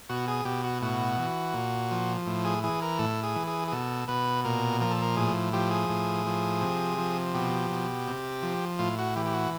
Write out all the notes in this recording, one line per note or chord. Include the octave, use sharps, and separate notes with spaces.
B2 F#4
G#4
B2 G4
F#4
A2 F#4
E3
A#2
F3
A2
G#4
E3 G#4
A#4
A2 A4
G#4
E3
G#4
G#4
B2 A4
B2 B4
A#2 A#4
F3 A#4
A4
A#4
A2 G#4
F3 G4
G#4
A2
F3
C3
F3
B2 G4
B2
C3
F3
A2 F4
F#4
E3 G4
G4
F#4